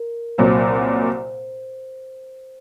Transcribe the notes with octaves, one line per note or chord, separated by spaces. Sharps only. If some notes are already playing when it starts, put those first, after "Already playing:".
Already playing: A#4
C2 A#2 F#3 C5